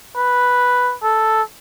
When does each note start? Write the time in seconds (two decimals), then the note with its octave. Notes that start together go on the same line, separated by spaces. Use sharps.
0.16 B4
1.03 A4